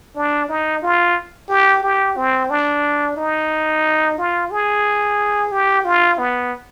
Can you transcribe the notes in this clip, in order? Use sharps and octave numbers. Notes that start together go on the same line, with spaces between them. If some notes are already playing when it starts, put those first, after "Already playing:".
D4
D#4
F4
G4
G4
C4
D4
D#4
F4
G#4
G4
F4
B3